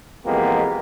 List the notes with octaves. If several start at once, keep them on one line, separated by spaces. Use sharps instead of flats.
F2 E3 G#3 A#3 B3 G4